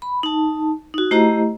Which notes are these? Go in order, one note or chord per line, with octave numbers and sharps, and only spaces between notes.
B5
D#4 A5
D#4 F#4
A3 E4 G4 C5 D#5 A#5